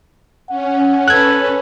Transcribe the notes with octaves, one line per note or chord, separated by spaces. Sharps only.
C#4 F#5
A4 B4 F#6 G#6